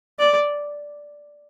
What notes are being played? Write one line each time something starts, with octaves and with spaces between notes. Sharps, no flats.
D5